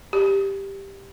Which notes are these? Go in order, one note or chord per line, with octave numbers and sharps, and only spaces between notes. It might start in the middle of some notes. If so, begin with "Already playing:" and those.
G4